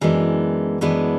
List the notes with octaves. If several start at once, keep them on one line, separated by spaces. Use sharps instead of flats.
F#2 E3 G#3 B3 D4
F#2 E3 G#3 B3 D4